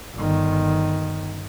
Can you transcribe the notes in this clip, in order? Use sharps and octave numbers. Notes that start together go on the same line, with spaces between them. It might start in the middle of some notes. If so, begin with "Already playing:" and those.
G1 D#3